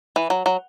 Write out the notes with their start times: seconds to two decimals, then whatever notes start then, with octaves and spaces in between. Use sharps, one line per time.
0.16 E3
0.30 F#3
0.46 F#3